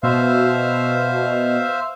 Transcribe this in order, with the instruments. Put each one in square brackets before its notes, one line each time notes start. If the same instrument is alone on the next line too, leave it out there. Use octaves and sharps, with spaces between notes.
[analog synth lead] B2 [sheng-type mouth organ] C5 E5 F5